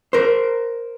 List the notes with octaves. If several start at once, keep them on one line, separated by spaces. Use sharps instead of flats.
A#4 C5